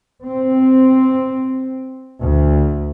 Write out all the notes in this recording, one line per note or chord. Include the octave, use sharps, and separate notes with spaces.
C4
D2